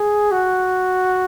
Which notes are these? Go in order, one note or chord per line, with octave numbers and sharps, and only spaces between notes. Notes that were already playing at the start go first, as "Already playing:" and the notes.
Already playing: G#4
F#4